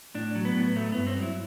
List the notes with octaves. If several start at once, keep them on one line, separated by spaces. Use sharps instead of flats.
A2 D4
F#3
B3
A2
F#3 A3
G2 B3
C4
F#3
E4